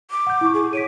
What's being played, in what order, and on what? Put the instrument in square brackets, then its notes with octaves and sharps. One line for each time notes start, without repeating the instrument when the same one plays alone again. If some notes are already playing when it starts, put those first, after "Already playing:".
[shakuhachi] D6
[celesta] F#5 G6
E4 C#6
[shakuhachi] G#4
[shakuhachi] C#5 [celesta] B6 D7 D#7